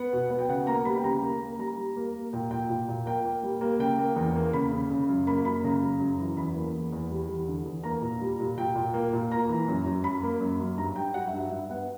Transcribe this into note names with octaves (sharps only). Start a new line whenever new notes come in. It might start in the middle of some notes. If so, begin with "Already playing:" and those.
Already playing: B3 F#5
B2
B3
G5
C#3 F#5
A#3 A#5
G3 B5
G5
C#3 A#5
A#3
A#3
G3 A#5
G3
A#3
A#3
A#2 G5
A#2 G5
A#2
A#2
A#3 G5
A#3
G3
A#3
C#3 G5
A#3
E2
A#3
C#3 B5
C#3
C#3
F#2
A#3 B5
F#2 B5
C#3 A#5
F#2
F#2
E3
E2 B5
A#3
E2
E2
G3
E2
D3
E2
A#3 A#5
A#2
G3
A#2
A#2 G5
A#2
A#3
A#2
A#3 A#5
E3
F#2
F#2
F#2 B5
A#3
F#2
F#2
G2 A#5
G2 G5
F#3 F#5
E5
G2
E5
G2 E5
B3 F#5